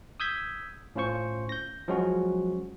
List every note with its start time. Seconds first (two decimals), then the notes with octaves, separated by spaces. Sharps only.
0.20 D#6 E6 G6 G#6 B6
0.96 A2 C#4 F4 C5 C#6
1.49 G6 A#6
1.88 F3 F#3 G#3 C#4 F#4